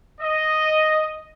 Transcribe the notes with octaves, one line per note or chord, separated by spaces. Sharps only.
D#5